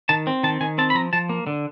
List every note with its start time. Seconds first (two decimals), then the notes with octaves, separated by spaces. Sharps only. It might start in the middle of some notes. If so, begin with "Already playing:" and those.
0.09 D#3 A5
0.27 C4
0.43 D#3 A5
0.61 D#3 G#5
0.78 C4 A5
0.90 B5
0.95 F3 A#5
1.13 F3 A5
1.29 A#3
1.47 D3